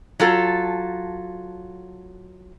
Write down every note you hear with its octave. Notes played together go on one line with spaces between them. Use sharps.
F#3 F4 A4